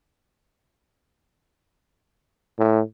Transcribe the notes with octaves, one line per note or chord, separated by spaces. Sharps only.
A2